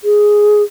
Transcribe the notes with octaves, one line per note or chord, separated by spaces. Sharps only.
G#4